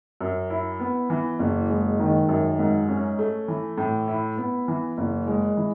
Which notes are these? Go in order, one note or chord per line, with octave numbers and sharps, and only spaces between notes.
F#2
E4
B3
E3
F#1
G#3
D#3
F#2
G#2
C#4
A3
E3
A2
E4
B3
E3
F#1
G#3
E3